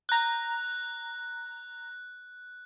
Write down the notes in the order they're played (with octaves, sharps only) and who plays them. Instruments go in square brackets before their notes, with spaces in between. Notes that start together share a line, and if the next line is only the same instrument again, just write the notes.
[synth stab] A#5 G6 [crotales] F#6